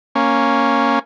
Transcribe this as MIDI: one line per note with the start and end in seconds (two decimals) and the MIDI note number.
0.15 0.99 58
0.15 0.99 61